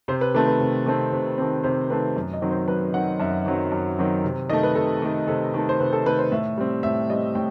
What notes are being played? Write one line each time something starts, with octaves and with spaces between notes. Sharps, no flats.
C3 C5
B4
D#3 A3 C4 B4
B4
C3
D#3 A3 C4
C3
D#3 A3 C4
C3 C5
D#3 A3 C4 B4
F#2
D#5
D#3 F#3 C4
C5
F#2 B4
D#3 F#3 C4 F#5
F#2 E5
D#3 F#3 C4
F#2
D#3 F#3 C4
C3
D#3 A3 D#5
B4
C3 A4
D#3 A3
C3 A4
D#3 A3
C5
C3 B4
A4
D#3 A3 B4
C5
A2 E5
G3 C4
A2 E5
G3 C4 D#5
A2 G5